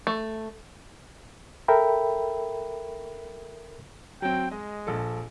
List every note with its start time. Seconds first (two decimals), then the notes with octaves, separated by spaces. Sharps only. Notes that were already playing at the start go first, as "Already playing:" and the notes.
0.07 A3
1.68 A4 A#4 E5 G5 B5
4.22 F#3 C4 G5
4.51 G#3 D#5
4.87 A#1 A4